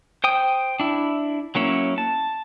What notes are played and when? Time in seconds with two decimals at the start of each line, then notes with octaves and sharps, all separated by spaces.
0.24 C5 G5 D#6
0.80 D4 E4
1.55 F#3 A#3 C#4 E4
1.98 A5